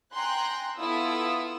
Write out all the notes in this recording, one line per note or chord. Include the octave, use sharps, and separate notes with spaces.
G5 G#5 A#5 C6 F#6
B3 E4 F4 A4 D#6 E6